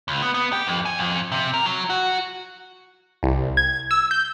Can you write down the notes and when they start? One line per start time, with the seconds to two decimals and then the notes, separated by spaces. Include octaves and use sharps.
0.08 C#2
0.22 B3
0.34 B3
0.53 G4
0.67 F2
0.86 G#5
0.98 F2
1.32 C3
1.54 A#4
1.66 F#3
1.90 F#4
3.23 C2
3.57 G#6
3.91 E6
4.11 G6